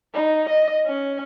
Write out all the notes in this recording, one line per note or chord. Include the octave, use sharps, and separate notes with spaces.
D#4
D#5
C#4